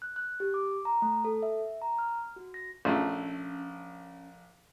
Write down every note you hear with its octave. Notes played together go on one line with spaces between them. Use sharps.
F#6
F#6
G4
D6
A#5
A3
A4
E5
A#5
F6
F#4
A#6
A#1 A3 C#4